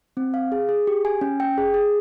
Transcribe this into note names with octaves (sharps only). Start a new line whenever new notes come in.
C4
F5
G#4
G#4
G4
G#5
C#4
G5
G#4
G#4